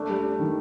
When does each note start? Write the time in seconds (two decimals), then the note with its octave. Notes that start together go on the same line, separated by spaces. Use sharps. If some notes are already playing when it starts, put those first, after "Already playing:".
Already playing: A3 D4
0.09 G3
0.23 D4
0.39 D#3